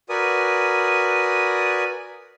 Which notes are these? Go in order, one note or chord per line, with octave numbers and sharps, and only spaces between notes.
F#4 A#4 B4 D5 G#5 D#6